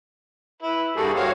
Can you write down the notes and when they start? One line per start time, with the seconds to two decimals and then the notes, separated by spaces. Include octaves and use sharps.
0.63 E4 B4
0.96 G2 G3 A#3 F#4 G#4 A4
1.15 F#4 G4 C5 C#5 F5